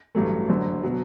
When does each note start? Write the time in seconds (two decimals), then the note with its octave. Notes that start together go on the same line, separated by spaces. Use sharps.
0.15 A1 G2 F#3 A3
0.49 F#1 F#2 D3
0.83 B2 F#3